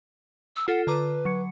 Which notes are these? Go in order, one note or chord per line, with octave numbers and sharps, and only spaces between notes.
E6
F4 A4 F#5
D3 B4 A#5 D6
F#3 C#7